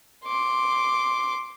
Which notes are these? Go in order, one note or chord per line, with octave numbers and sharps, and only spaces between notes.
C6 D6